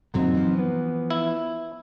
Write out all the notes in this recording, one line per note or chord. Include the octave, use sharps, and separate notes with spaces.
F#2 A#2 D3 F#3 C4 D#4
E3 F3
B3
E4